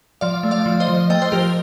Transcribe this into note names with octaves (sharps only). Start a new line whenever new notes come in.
F3 D5 F5
A3
D5 F5
F3
C5 D#5
F3
A3 D#5 G5
C5
F3 G4 A#4